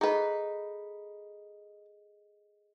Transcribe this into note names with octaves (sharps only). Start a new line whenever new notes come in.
D#4 G#4 A4 B4 D#5